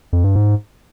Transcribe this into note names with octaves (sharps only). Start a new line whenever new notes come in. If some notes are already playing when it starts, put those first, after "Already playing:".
F2
G2
G#2